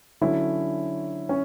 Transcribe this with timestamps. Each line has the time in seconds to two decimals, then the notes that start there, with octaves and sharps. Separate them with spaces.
0.21 D3 F#3 C#4 E4
1.29 C#4